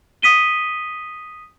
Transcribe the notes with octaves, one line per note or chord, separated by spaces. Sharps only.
D#6 B6 D#7 G7